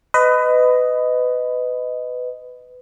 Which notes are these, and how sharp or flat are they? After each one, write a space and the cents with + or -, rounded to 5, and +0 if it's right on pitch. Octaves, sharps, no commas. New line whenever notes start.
B4 +25 D#5 +0